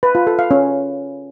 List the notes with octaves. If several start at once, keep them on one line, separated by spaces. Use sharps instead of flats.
B4
F4
A4
F5
C#4